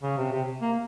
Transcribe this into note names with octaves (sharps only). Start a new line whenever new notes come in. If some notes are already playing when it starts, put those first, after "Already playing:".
C#3
C3
C3
A#3